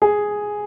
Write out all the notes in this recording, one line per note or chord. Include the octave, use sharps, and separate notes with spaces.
G#4